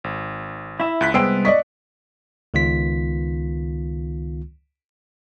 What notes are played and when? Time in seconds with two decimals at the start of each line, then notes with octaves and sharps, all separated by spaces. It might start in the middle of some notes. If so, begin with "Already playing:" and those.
0.04 G#1
0.80 E4 E5
1.01 C#2 F#6 B6
1.14 C2 G#3 B3 C5 G5 E6 D7
1.45 D5 D#5 C#6 B6
2.54 C#2 D#3 B3 F4 B6